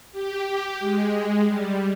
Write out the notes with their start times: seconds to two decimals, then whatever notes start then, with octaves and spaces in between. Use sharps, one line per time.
0.12 G4
0.45 G4
0.79 G#3
1.46 G3